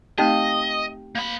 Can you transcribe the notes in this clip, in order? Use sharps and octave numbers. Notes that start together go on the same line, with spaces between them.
A3 C4 D#4 G4 D#5 F5 A5
A#3 B5